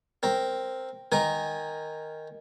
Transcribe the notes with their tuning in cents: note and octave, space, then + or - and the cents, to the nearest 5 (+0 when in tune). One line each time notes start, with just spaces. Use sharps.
C4 +0 A#4 -5
D#3 +0 A#4 +0 G#5 -25